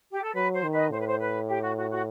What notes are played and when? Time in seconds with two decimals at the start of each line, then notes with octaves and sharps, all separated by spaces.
0.12 G4
0.23 A4
0.34 F#3 B4
0.54 C5
0.64 D#3
0.73 B4 D#5
0.91 A2 C5
1.00 B4
1.07 C5
1.20 B4
1.49 G4
1.62 F#4
1.77 F#4
1.90 F#4